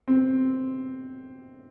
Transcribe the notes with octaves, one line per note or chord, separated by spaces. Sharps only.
C4